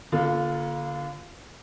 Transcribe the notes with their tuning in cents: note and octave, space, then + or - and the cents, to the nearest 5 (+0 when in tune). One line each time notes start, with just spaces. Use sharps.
D3 -25 A#3 +25 F4 +0